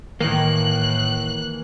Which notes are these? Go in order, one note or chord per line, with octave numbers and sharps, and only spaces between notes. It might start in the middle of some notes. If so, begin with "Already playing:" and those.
A2 D#3 E3 A#3 F#6